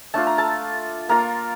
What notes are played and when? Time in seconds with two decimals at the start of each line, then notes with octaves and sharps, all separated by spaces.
0.14 A3 D4 F4 A5
0.27 A#5
0.38 A4 A5
1.09 A#3 F4 A#4 A#5